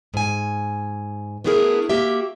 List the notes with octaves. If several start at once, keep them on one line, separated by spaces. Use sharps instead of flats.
G#2 G#5
A3 B3 D4 E4 G#4 A#4
A#3 F#4 G4 E5